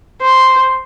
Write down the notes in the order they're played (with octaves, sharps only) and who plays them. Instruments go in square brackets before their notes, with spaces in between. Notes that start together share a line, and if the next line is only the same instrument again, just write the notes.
[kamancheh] C5